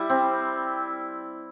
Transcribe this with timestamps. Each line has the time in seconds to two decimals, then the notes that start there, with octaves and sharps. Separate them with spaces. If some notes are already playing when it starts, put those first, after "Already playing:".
Already playing: G3 E4
0.10 C4